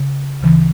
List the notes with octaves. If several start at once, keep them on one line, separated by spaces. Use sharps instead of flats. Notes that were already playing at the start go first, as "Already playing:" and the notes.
Already playing: C#3
D2 C#3 E3